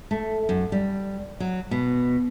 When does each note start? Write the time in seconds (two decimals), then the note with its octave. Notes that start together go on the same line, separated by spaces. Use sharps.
0.11 A3
0.49 F#2
0.72 G3
1.40 F#3
1.71 B2